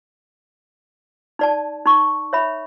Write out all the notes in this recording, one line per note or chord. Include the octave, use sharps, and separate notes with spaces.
D#4 D5 A5
D#4 C#6
C#5 E5 B5